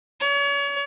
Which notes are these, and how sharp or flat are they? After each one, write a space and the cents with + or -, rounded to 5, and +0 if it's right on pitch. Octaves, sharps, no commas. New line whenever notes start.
C#5 +35